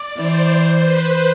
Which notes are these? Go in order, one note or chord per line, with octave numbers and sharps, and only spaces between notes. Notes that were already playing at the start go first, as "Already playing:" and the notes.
Already playing: D5
E3 C5
B4